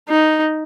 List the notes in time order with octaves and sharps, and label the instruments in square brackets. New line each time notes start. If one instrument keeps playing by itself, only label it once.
[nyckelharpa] D#4